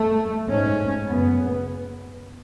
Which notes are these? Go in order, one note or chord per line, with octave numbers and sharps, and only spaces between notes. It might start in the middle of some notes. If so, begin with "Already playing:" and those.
Already playing: A3
G#2 C#4
F#2 C#3 B3